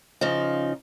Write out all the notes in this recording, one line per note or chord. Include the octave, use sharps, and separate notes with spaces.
C#3 F3 D#4